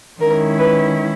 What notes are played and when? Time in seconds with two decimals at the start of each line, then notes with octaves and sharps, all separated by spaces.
0.20 D#3 G#3 C#4 E4 A#4
0.58 B4